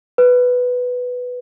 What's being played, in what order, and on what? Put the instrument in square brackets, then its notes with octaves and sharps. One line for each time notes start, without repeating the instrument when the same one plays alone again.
[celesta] B4